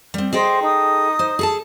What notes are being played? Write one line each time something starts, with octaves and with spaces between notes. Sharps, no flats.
G3 C4
G#4 A4 C5 D#5 G5
D#4 D#6
C5
G#4 A4 A5